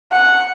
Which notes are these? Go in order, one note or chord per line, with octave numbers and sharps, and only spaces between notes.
F#5